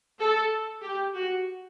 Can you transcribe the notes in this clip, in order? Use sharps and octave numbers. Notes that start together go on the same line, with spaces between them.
A4
G4
F#4